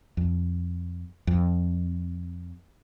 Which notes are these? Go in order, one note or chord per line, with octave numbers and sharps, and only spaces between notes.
F2
F2